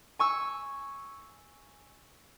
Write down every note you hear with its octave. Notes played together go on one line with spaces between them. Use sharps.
G#5 C#6 E6